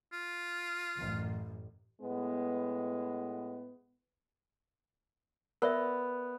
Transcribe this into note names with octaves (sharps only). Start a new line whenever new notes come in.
F4
A1 F#2
A2 G#3 B3
B3 A#4 D5 E5